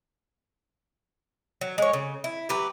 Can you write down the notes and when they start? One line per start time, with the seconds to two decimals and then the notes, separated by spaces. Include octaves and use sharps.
1.61 F#3
1.78 G#3 C#5
1.93 C#3
2.24 E4
2.49 F#3 G4 B4